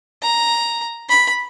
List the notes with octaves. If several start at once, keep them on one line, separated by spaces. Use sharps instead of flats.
A#5
B5